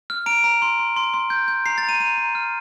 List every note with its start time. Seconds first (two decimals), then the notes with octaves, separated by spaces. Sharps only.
0.10 F6
0.26 A#5 D7
0.44 A#5
0.62 C6
0.79 C6
0.96 C6
1.14 C6
1.30 G6
1.48 G6
1.66 A#5 C7
1.78 A6
1.83 A#5
1.89 D#7
2.00 A#5 D#7
2.18 A#5
2.35 F6